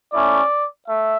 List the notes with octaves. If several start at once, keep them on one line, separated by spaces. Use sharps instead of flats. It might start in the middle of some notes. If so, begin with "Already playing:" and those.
A3 C#4 E4 D5
A3 E5